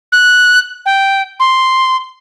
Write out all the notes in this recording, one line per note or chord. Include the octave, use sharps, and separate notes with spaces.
F#6
G5
C6